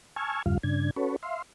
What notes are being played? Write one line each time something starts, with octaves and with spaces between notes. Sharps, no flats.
G#5 A5 C#6 E6 F6 G#6
E2 G2 C#3 G3 F4 F5
G2 C#3 D4 G#6
C#4 F#4 A4 B4 C#5
E5 F5 C6